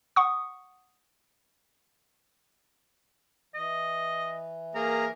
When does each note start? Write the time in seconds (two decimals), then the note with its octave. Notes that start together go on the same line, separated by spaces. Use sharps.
0.16 F#5 C#6 D#6
3.54 E3 D#5
4.75 A#3 G#4 A#4 A#5